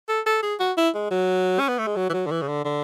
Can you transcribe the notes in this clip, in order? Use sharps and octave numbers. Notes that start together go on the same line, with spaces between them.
A4
A4
G#4
F#4
E4
G#3
F#3
C#4
B3
A3
G#3
F#3
E3
F#3
D3
E3
C#3
D3
D3